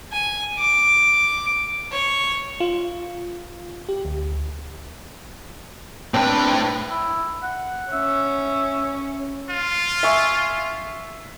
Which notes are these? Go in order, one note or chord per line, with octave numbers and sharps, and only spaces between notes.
G#5
D6
C#5
F4
G4
D2
A2 C4 D4 B4 G5
E4
F#5
C#4 E5
F4
E5 G#5 C#6